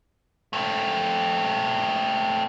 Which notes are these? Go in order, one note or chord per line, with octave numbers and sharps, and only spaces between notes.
A3 C4